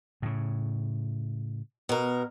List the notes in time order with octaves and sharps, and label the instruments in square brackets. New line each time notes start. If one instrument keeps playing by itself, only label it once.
[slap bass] A2 C#3
[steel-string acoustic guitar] B2 A#4